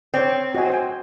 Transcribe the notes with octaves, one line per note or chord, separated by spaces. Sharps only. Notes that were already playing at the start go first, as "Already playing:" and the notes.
C4 C#5 D5
F#4 D#5 G#5
C5 G5 G#5